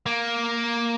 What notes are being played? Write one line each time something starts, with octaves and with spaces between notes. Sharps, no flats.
A#3